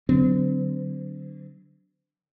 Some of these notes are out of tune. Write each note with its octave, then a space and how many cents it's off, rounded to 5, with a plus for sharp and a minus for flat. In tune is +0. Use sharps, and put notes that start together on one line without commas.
D3 +0 F#3 +15 C4 -35